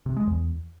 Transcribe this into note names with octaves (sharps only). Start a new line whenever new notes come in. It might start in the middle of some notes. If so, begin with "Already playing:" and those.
C3
G#3
E2